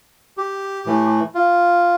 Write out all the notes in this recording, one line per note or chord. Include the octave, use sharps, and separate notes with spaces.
G4
A2 E3 A3
F4